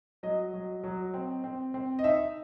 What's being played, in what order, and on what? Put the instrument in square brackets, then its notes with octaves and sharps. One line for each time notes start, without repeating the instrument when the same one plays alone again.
[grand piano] F#3 D#5
F#3
F#3
C4
C4
C4
D#5
D#4 E5